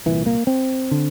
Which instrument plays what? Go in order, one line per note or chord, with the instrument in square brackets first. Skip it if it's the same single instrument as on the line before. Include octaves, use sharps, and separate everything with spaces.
[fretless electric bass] C2 A#2 E3
A#3
C4
D3